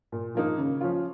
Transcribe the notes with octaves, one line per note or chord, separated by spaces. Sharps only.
A#2
F3 A#3 D#4
C#3
F3 C#4 F4